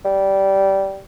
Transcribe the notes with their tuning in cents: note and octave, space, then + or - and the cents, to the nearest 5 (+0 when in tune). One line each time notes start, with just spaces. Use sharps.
G3 -15